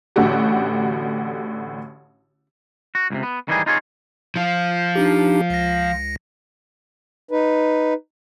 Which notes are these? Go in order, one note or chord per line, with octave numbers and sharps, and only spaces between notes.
A1 A2 D3 F#4 G4
F#4
C#2 A2 C3
B3
D#3 E3 G3 D#4 G4 G#4
D#4 F4 G#4 C#5
F3 F4
D4 D#4 G4
C#2 A#6
D#4 B4